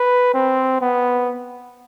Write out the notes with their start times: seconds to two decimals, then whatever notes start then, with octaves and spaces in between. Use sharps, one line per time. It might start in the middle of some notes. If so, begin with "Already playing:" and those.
Already playing: B4
0.34 C4
0.81 B3